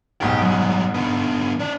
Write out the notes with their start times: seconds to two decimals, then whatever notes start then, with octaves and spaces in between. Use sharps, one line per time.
0.21 F#1 G#2 B2 G4 G5
0.42 F#3 G3
0.94 D3 B3
1.59 C#4 D5